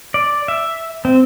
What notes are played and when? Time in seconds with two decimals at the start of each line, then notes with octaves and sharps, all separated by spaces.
0.14 D5
0.48 E5
1.05 C4